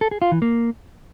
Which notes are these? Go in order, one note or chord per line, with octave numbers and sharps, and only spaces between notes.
A4
G#4
F4
E3
A#3